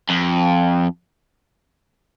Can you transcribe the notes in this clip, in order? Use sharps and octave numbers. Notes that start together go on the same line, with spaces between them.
F2